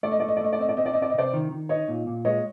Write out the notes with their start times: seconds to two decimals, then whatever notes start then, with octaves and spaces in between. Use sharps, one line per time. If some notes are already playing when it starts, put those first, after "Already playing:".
0.03 A3 D5
0.12 D#5
0.20 A3 D5
0.29 D#5
0.36 D5
0.41 A3 D#5
0.52 D5
0.59 C4 D#5
0.69 D5
0.77 C4 D#5
0.86 D5
0.93 C4 D#5
1.02 D5
1.10 D#5
1.14 C3 C5 D5
1.33 D#3
1.52 D#3
1.69 D#4 C#5 D#5
1.88 A#2
2.07 A#2
2.25 G#3 C#5 D#5